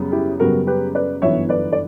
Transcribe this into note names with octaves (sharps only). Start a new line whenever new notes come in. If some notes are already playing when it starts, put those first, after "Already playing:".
Already playing: F#2 C#3 G3 B3
E4 G4
F#2 C#3 G3 B3 F#4 A#4
G4 B4
B4 D5
G1 F#2 E3 B3 C#5 E5
B4 D5
D5